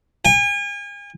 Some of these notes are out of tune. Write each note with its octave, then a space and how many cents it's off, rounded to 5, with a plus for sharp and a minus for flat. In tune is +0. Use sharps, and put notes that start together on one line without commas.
G#5 -40